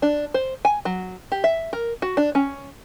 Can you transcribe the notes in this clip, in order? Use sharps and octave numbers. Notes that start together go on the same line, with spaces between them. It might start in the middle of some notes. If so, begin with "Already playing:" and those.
D4
C5
G#5
F#3
G4
E5
A#4
F#4
D4
C#4